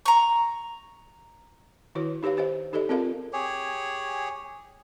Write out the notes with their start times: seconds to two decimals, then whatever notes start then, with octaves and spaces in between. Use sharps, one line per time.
0.06 A#5 C#6
1.95 D#3 E4 F#4 B4 C#5
2.23 D#4 G4 B4 C#5 F5
2.37 G4 C5 D#5 F5
2.73 D#4 G4 A4 D5 D#5
2.89 C4 F4 G#4 A#4 D#5 F5
3.33 G4 G#4 C#5